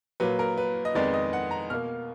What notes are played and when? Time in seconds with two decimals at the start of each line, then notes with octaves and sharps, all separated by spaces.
0.20 A#2 F#3 A#3 B4
0.39 A#4
0.58 B4
0.85 D#5
0.95 F2 D#3 G#3 B3 D5
1.14 D#5
1.33 F#5
1.51 A#5
1.70 B2 A#3 F6